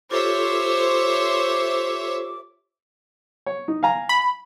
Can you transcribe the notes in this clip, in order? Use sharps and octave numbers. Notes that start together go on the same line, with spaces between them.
F4 G4 A4 C5 C#5 E5 D6
C#5
D#4
F5 G#5 A#5
B5